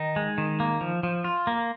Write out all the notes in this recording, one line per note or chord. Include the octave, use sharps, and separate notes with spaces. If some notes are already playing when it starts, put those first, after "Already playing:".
Already playing: D#3 D#4
G#3
D#3
A#3
F3
F3
F4
A#3